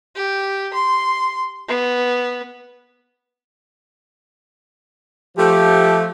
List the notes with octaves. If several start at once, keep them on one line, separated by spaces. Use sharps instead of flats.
G4
C6
B3
F3 A3 G4